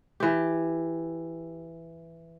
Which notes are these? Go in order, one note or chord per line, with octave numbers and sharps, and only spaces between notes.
E3 G4